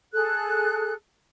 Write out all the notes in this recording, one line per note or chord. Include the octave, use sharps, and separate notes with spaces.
G#4 A4 F#6